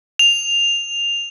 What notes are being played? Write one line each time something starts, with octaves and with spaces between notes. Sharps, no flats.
F7